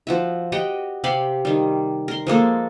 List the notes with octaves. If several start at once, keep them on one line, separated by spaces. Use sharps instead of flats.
F3 F#4 E5
F#4 G4 D#5 G5
C3 G4 F5 B5
D#3 G3
A#4 C6
F3 G#3 A#3 A4